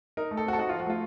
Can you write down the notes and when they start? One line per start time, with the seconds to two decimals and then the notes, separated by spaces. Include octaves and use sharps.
0.17 D#4 A#4
0.31 A3
0.37 A4
0.45 C4 F#4
0.53 A4
0.58 D#4 F#4
0.69 F3 F4
0.80 F#4
0.86 A3 F4